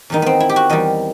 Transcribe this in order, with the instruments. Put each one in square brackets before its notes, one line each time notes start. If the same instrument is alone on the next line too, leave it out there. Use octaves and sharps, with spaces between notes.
[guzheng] E2 D#3 G3 D#4
B3 C4
E4
G4
F#4
E2 D#3 G3 D#5